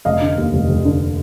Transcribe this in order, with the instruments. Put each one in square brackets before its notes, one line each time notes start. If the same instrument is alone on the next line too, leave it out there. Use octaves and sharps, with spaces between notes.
[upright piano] F1 D#5 F5
D3
D#2
F1
F1
D3